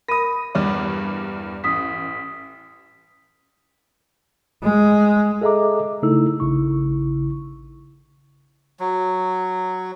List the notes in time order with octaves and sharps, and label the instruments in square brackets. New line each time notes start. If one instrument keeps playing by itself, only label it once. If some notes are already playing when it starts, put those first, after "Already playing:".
[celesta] A#4 B5 D#7 [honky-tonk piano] D#6 A#6
[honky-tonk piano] E2 G2 D5
[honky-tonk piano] A1 [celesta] D#6 B6
[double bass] G#3
[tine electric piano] G#4 A4 D#5 E5 A#5 D6
C#3 A3 D#4 E4 A4 E6
A1 C#3 E4 C#6
[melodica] F#3